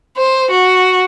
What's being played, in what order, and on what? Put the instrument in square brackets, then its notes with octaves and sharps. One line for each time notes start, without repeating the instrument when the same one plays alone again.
[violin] C5
F#4